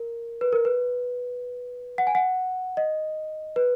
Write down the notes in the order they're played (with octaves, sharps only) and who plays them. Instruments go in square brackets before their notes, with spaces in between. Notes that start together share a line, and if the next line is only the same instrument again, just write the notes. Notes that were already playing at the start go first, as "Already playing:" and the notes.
Already playing: [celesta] A#4
B4
A#4
B4
F#5
G#5
F#5
D#5
B4